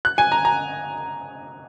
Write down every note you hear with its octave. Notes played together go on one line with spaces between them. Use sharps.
F#6
G#5
A#5
A#5